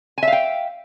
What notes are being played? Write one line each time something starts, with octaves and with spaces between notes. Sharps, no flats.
E5 F5 G5 G#5